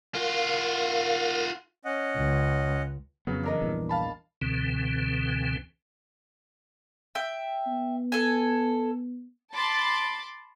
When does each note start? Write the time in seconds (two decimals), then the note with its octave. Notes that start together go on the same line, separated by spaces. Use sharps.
0.14 F4 F#4 A#4 F5
1.85 C#4 D#5 F#5
2.17 C#2
3.27 F2 C#3 F#3 B3
3.43 E3 D4 A#4 D#5
3.62 A#1 E2 G2
3.89 F5 A5 B5
4.41 C#2 B2 D3 E3 C4
7.15 E5 G5
7.67 B3
8.12 A4 G#5
9.52 A5 B5 C6 D6 A6